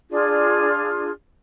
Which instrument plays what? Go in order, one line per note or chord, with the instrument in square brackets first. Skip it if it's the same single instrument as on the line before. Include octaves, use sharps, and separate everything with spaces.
[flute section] D4 F4 G#4 D5